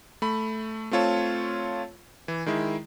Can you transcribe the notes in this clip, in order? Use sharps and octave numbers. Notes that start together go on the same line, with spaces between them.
A3 B5
A3 C4 F4 C#5 A5
E3
D#3 G#3 E4